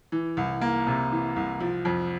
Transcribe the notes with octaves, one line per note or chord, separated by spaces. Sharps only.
E3
C2
A#3
C3
E3
C2
F3
F2